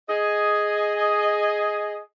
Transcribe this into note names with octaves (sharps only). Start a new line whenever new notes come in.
G#4 D#5